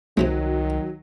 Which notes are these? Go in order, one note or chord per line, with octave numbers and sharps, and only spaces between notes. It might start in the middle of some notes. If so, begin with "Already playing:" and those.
C2 C3 D#3 E3 F#3 G#3